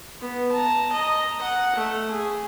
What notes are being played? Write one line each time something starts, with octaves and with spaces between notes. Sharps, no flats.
B3
A5 A#5
D#5 A#5
F#5
A3
G#4